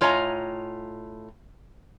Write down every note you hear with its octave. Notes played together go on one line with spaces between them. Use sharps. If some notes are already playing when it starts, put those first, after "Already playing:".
A2 F4 C#5 D#5 G#5 A#5